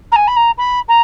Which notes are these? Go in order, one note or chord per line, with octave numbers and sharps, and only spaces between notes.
A#5
G#5
B5
A#5
B5
A#5